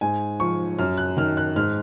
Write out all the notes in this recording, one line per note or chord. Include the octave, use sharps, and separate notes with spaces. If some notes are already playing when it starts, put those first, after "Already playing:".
G#2 G#5
F3 C#6
F#2 F6
F#6
D#3 F6
F#6
G#2 F6